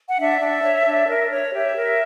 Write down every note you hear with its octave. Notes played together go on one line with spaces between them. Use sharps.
F#5
D4 E5
D4
C#5
D4
A#4
C#5
G4 E5
A#4